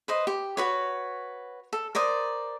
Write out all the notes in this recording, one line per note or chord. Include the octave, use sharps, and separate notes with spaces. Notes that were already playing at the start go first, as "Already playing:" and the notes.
B4 C5 D#5
G4
F#4 B4 C#5
A4
A#4 C5 D5 D#6